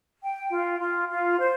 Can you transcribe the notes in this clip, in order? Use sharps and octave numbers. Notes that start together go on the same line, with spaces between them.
G5
F4
F4
F4
C5